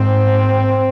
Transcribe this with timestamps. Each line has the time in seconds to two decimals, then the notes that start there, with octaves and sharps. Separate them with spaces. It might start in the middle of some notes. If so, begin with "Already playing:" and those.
Already playing: G#2 C4